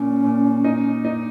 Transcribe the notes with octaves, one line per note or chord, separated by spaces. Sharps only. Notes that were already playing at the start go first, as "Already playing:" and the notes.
Already playing: A#2 C#4
A#2
D#4
D#4